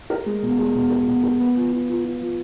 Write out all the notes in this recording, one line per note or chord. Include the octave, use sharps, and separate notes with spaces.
A#4
G#3
B2
G#3
B2
A#4
B2
A#4
B3
F3
F4
F4
F4
F3